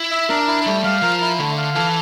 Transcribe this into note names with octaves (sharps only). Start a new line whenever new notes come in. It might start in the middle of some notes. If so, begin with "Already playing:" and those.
Already playing: E4
E5
D4 A#4
E4
G3 A3
G3 F5
F3 A#4
E4
D3 A3
F5
E3 A4